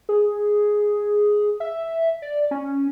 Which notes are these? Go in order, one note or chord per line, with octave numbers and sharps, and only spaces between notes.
G#4
E5
D5
C#4